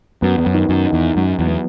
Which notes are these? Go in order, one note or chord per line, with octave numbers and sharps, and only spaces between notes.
F#2 B3
E2
F#2
D#3
F#2
D#4
E2
F#2 F#3
E2
B3